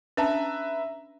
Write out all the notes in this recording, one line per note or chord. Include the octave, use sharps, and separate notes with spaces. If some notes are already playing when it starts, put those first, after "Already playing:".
C#4 D4 B4 E5 A5 A#5